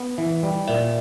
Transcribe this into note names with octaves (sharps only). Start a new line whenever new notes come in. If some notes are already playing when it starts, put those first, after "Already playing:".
Already playing: B3
E3
G3
A#2 D5 E5